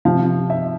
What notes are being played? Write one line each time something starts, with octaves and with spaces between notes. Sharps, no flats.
C3 F3 F5
E5